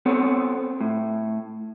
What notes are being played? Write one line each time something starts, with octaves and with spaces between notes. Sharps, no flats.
B3 C4 A4 C5 C#5
A2